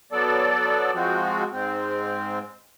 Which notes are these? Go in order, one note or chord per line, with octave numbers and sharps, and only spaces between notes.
F#3 B3 A4 D5
F3 G#3 C4 F#4
G#2 C4